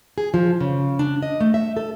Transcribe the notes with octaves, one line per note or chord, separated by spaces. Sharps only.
G#4
F3
C#3
D4
D#5
A3
E5
A4